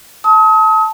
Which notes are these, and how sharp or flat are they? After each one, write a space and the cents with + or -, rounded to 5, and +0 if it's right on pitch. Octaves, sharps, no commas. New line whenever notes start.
A5 +0 D#6 +40